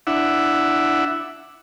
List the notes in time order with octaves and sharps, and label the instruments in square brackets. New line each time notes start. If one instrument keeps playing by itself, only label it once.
[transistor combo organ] D4 E4 E5 F#5